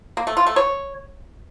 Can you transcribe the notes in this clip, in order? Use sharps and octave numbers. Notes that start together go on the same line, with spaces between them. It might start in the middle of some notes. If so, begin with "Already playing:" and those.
A#3
A3
F4
A3
C#5